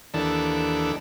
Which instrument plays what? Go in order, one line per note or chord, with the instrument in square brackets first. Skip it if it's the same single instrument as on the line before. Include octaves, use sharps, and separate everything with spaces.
[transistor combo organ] D#2 E3 D4 A4